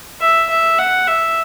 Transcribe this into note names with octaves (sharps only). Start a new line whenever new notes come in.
E5
E5
F#5
E5